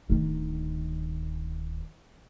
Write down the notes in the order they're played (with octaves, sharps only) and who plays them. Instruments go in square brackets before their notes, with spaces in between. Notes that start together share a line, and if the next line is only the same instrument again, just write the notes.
[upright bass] D1 D#3